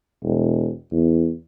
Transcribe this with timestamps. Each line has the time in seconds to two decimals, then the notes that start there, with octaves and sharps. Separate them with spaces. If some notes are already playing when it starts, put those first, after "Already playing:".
0.23 E1
0.92 E2